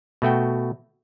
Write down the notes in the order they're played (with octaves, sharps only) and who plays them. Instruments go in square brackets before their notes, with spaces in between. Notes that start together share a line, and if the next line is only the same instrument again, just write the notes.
[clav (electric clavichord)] B2 A3 F#4 G5